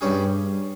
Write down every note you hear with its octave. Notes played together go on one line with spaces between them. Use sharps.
G2 G3 C#4 G#4